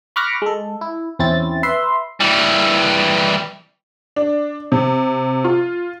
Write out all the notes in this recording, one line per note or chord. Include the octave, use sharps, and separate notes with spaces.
B5 C#6 D6 F6 F#6 A#6
G#3 A4
E4
E2 C4 C#4 E4 A6
B4 E5 C6
E3 G3
D4
C3
F4